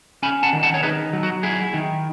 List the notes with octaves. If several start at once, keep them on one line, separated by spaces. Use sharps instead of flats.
C#4 G#5 B5
F#5 A5
D#3
F#5 A5
C#5
D#4 G#4 B4
F#3
F#4
E4 G#4
D#3